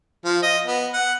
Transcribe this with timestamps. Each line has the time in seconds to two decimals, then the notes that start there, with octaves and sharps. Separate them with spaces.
0.25 F3
0.42 D#5
0.65 B3
0.93 F#5